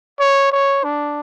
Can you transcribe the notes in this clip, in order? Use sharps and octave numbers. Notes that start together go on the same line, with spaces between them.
C#5
C#5
D4